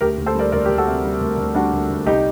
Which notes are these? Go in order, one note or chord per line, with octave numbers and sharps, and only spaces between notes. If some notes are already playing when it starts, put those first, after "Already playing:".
D2 G4 A#4
D2
A4 C5
G3 A#4 D5
D2 A#4 D5
G4 A#4
D2
F#4 A4
C3
G3
D2
D2
G3 D4 F#4
D2
D2
C2 D#4 G4